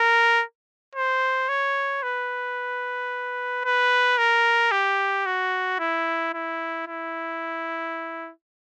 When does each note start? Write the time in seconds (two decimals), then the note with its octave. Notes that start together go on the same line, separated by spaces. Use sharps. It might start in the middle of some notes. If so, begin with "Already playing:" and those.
Already playing: A#4
0.95 C5
1.49 C#5
2.03 B4
3.64 B4
4.18 A#4
4.72 G4
5.26 F#4
5.79 E4
6.33 E4
6.87 E4